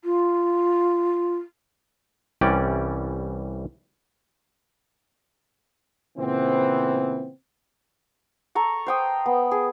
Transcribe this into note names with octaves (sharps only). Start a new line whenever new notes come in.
F4
C2 E3 G3 C#4 D5 G5
A#2 C#3 E3 B3 C4
A4 A#5 C#6
C5 G5 D#6
B3
G#4